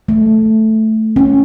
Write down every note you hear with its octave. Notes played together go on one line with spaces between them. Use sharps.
A3
C#4